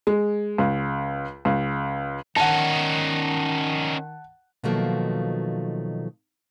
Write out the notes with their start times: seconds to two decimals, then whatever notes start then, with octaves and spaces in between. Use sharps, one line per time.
0.07 G#3
0.58 C#2
1.45 C#2
2.36 D#3 C#4 D#4 F#5 A5
4.64 B2 D#3 F3 F#3 A3 A#3